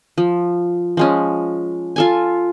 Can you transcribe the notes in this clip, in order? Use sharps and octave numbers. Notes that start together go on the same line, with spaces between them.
F3
F3 G#3 C#4
F4 A4 G#5